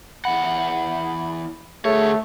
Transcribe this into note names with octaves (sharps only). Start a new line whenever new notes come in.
E2 F#5 B5
D2 A3 G#4 C#5